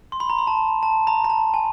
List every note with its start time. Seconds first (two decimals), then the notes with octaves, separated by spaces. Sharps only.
0.12 C6
0.20 B5
0.30 A#5
0.38 B5
0.47 A5
0.83 A5
1.07 A#5
1.24 A#5
1.30 A5
1.54 G#5